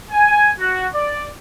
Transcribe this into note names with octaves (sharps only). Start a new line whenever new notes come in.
G#5
F#4
D5